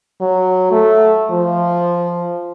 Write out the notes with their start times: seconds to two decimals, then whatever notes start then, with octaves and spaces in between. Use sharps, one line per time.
0.21 F#3
0.71 A3
1.31 F3